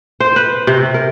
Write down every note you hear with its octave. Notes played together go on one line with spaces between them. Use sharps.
C5
B4
C3
A#4